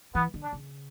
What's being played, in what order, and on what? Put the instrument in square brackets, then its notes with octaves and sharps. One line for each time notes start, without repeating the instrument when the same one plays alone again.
[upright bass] E3 [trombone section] B3
[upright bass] D3
[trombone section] D4
[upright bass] C#3